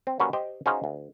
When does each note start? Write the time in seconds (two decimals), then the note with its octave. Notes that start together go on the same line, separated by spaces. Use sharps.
0.07 C4
0.20 F#3 G3 A#3 C#4 F#4 B4
0.33 G4 C5 D#5 G5
0.66 C#4 D#4 F#4 G#4 C5 F5
0.84 D2